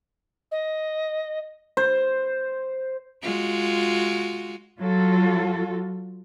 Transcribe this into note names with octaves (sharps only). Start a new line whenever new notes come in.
D#5
C5
G#3 F4 F#4
F#3 F4 F#4 A4